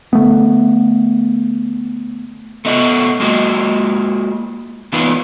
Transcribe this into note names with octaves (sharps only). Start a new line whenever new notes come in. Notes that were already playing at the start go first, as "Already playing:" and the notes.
D3 A3 B3
A3 B3 D#5 F5 F#5
G#3 A#3 F#4 D#5
E3 B3 D#4 F4 B4